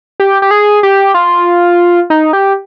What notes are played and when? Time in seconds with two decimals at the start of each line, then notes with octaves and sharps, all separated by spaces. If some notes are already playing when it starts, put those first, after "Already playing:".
0.20 G4
0.42 G4
0.51 G#4
0.83 G4
1.14 F4
2.10 D#4
2.33 G4